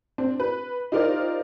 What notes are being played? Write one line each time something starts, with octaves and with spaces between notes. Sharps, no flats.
C4 D4
B4
D#4 F4 G4 A#4 C5 D5